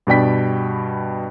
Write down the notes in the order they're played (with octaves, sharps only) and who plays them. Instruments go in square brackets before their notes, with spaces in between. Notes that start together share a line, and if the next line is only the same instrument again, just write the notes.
[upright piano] G2 B2 D5 G5 B6